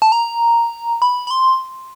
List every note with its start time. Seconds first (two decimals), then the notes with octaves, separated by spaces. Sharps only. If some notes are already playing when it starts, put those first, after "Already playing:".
0.02 A5
0.12 A#5
1.02 B5
1.27 B5
1.31 C6